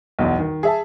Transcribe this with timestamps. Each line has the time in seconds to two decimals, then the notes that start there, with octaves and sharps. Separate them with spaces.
0.19 B1 E2
0.39 D#3
0.63 G#4 E5 A5